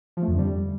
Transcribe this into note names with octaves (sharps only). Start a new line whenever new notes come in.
F3
A3
F2
D3
G3